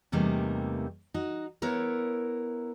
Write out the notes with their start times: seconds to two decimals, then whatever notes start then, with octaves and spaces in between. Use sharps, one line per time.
0.12 E2 C3 G3 A3 A#3 D#4
1.14 D#4 F#4
1.62 B3 E4 A#4 C#5